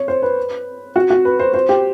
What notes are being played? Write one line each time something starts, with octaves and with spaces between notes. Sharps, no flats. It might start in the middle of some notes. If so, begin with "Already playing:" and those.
Already playing: C#5
C5
B4
F#4
F#4
B4
C5
C5
G4